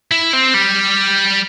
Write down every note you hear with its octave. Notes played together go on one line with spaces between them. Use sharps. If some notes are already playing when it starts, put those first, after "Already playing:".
E4
C4
G3